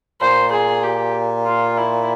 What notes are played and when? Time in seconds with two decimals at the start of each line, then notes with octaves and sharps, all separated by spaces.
0.21 A#2 C5
0.52 G#4
0.83 G4
1.46 F4
1.78 E4